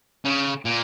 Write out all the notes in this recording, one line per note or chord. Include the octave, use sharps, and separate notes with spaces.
C#3
A#2